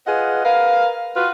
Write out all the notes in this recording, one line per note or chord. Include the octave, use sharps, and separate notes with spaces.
F4 G#4 B4 D#5 F#5
A#4 B4 F5
F4 F#4 B4